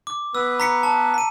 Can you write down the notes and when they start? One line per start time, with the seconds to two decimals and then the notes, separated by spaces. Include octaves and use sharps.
0.07 D6
0.35 B3 B4 E6
0.60 A#5 B6 C#7
0.83 A5
1.14 B6 D#7